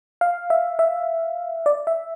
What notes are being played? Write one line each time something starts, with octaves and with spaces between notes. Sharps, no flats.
F5
E5
E5
D5
E5